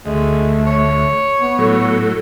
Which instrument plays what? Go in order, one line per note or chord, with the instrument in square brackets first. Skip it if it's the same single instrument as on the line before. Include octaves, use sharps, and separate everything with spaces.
[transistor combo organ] D2 [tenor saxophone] G#3 [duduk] A3
[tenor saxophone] C#5
[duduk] B3
[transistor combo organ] A2 F#3 [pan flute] A4